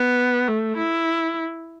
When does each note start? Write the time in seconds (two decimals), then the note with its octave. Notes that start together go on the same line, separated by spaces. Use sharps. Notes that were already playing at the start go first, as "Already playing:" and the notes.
Already playing: B3
0.48 A3
0.77 E4